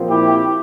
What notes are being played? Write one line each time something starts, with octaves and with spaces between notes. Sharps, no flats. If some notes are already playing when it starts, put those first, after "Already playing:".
Already playing: A#2 F3 C4
E4 G4